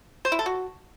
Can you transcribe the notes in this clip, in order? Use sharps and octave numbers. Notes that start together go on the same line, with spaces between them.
C5
E4
A4
F#4